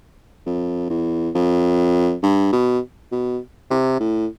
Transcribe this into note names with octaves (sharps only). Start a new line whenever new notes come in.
F2
E2
F2
G2
B2
B2
C3
A2